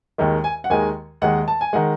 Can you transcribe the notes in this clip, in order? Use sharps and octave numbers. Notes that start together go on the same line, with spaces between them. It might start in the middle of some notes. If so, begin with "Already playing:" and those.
D#2 D#3 G#3
G#5
F#5
D#2 D#3 G#3 G#5
D#2 D#3 G#3 F#5
A5
G#5
D#3 G#3 F#5